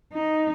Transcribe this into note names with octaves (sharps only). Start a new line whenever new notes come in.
D#4